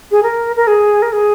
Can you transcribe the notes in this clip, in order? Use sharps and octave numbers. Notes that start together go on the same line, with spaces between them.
G#4
A#4
A#4
G#4
A#4
G#4